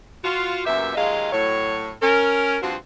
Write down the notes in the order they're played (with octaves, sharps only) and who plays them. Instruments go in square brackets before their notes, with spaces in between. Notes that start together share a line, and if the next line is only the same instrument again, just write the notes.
[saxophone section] F4 F#4
F#2 A#2 B3 G4 E5
D#2 F#3 G#3 F4 D#5 F5
A2 F#3 C#5
C#4 A#4
G2 F3 C4 F4 F#4